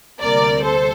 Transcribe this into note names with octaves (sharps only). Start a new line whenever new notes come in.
D2 C3 G3 A#3 A#4 D5
A4 C5